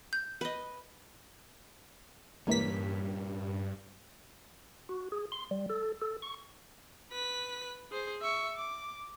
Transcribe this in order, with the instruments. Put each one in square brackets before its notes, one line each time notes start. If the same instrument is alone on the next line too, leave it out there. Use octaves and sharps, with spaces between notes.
[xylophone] G6
[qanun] B4 D#5
[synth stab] C#2 E3 B6 [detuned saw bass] G2 [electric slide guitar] G3 C#4 [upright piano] A#3
[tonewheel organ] F#4
G#4
C6
G3
A4
A4
C#6
[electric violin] B4 B6
G#4 C5
E5 C#6
D6